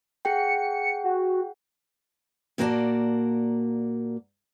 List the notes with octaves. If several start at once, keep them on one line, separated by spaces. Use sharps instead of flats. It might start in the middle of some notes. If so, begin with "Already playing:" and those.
G#4 F#5 G5 C#7
F#4
A#2 A#3 F#4 C#5 D5 A5